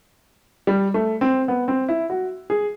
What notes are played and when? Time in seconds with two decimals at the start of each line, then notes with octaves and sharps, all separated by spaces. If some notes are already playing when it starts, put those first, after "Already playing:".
0.67 G3
0.94 A3
1.21 C4
1.48 B3
1.68 C4
1.89 E4
2.10 F#4
2.50 G#4